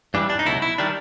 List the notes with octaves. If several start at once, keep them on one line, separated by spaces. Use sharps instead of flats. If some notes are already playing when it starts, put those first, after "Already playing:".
G2 E3 G3 D4
D4
D#4
C#2 B2 F#3 E4
E4
D#3 G3 D4